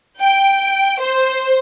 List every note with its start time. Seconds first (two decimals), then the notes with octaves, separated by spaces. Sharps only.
0.19 G5
1.00 C5